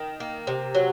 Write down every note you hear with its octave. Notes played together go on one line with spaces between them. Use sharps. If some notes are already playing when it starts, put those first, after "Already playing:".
Already playing: D#3
A#3
C3
F#3